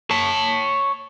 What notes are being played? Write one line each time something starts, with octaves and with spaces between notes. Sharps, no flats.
C#5 A5